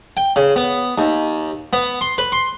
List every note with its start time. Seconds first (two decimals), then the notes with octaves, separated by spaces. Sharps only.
0.17 G5
0.36 C#3
0.56 B3
0.98 D#2
1.73 B3
2.01 C6
2.18 B4
2.32 C6